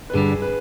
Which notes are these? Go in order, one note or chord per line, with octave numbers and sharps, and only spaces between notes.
B4
G2 D3 G3 G#4
B4